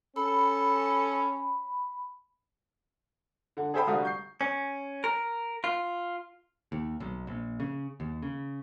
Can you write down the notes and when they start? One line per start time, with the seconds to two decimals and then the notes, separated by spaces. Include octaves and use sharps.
0.16 C#4 A4 B5
3.57 D3 F#5
3.74 G#4 A4 C5 E5 G5 B5
3.87 F1 D3 G3 F#4 F5 D#6
4.03 C#6 G6 C7
4.41 C#4
5.04 A#4
5.64 F4
6.72 D#2
7.00 B1
7.27 A#1
7.60 C#3
8.00 D#2
8.22 C#3